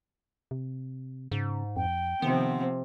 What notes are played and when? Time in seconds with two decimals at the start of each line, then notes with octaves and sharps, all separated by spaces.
0.51 C3
1.32 G#2 C#3
1.76 F2 G5
2.22 C3 D#3 F3 B3 C4